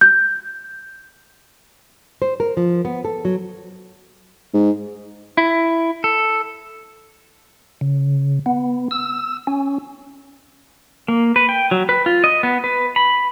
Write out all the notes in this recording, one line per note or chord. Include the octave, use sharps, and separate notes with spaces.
G6
C5
A#4
F3
B3
A4
F#3
G#2
E4
A4
C#3
B3
E6
C#4
A#3
B4
G5
F#3
B4
F4
D#5
B3
B4
B5